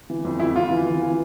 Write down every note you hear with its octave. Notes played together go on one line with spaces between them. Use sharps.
E3
F2
F2 E4
F2 F4
E3
E3
E3